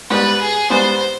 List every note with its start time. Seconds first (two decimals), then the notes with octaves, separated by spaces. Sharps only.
0.10 G#2 G3 B3 B4
0.40 G#4
0.70 G#2 G3 B3 C5